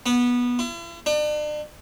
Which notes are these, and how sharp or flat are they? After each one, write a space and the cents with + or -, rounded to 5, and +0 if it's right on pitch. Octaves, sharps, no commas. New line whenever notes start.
B3 -15
E4 +45
D4 +40